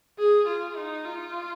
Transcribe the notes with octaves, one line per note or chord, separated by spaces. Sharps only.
G#4
F4
D#4
F4